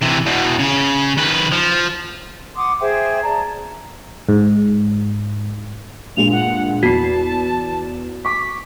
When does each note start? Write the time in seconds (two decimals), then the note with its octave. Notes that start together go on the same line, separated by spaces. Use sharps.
0.01 C3 E3
0.26 E2 B2
0.59 C#3
1.17 D#3 B4
1.52 F3
2.55 F#5 C6 D6 D#6
2.80 G#4 C5 E5 G5
3.24 D5 A5 A#5
4.29 G#2
6.17 G2 A#2 G#3 F7
6.32 F#5
6.83 E2 F#4 A5 C7
8.25 C#6 D6 B6